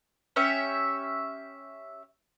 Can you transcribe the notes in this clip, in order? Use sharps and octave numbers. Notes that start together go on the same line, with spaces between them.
C#4 G4 C#5 E5